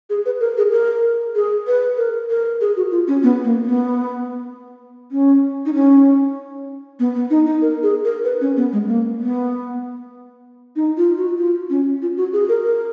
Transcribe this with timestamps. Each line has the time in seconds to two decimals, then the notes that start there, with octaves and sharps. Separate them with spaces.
0.10 G#4
0.26 B4
0.40 A#4
0.57 G#4
0.72 A#4
1.35 G#4
1.67 B4
1.97 A#4
2.30 A#4
2.61 G#4
2.77 F#4
2.91 F4
3.08 C#4
3.23 B3
3.44 A#3
3.65 B3
5.12 C#4
5.66 D#4
5.74 C#4
6.99 B3
7.15 B3
7.30 D#4
7.46 D#4
7.62 A#4
7.83 G#4
8.05 A#4
8.24 B4
8.41 C#4
8.57 B3
8.73 G#3
8.88 A#3
9.20 B3
10.76 D#4
10.97 F4
11.17 F#4
11.38 F4
11.70 C#4
12.02 F4
12.17 F#4
12.33 G#4
12.49 A#4
12.64 A#4